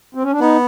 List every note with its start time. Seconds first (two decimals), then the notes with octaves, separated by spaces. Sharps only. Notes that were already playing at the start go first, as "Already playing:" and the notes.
0.15 C4
0.23 C#4
0.32 D4
0.40 B3 D#4